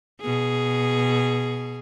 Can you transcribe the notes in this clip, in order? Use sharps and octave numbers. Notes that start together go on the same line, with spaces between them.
B2 G#4